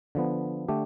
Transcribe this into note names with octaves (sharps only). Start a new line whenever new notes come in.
D3 F3 B3
D3 A3 D4 G4